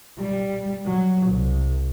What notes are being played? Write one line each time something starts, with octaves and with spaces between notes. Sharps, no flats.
G3
F#3
C2